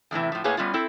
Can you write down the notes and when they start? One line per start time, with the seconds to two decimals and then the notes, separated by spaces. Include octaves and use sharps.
0.11 E2 A2 C3 E3
0.32 A2 F3
0.44 A2 A#3 G#4 B4 C#5
0.57 G3 B3 C#4 F4
0.74 C4 E4 A4